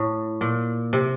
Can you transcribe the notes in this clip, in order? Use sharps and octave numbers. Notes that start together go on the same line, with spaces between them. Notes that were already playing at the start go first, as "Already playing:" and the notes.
Already playing: A2
A#2
C3